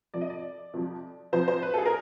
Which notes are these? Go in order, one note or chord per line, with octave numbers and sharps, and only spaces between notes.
F2 C3 F3 D5
D#5
D5
F2 C3 F3
F2 C3 F3 C5
C5
B4
A4
G#4
A#4